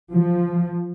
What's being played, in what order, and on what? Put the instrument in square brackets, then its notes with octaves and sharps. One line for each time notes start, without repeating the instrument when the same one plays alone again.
[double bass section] F3